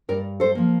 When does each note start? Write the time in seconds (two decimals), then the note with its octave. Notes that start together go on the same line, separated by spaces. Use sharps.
0.09 G2 A#4 D5
0.40 A4 C5
0.55 F3 A#3